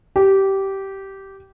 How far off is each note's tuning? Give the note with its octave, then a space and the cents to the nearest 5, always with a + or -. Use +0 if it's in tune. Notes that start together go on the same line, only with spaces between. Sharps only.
G4 -15